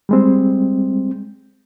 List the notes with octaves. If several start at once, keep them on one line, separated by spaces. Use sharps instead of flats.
G3 G#3 C4